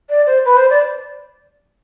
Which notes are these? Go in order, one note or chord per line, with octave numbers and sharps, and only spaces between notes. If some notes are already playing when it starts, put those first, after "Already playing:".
D5
C5
B4
C5
D5